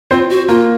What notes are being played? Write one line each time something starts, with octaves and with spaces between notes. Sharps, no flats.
C4 F4 C5
F#4
A#3 F4 A#4